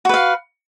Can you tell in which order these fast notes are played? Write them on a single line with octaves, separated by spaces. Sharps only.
F#4 B4 F5